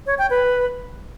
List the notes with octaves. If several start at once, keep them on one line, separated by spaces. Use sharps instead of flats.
C#5
G5
B4